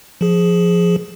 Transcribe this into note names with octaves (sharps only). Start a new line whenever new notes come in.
F3 G#4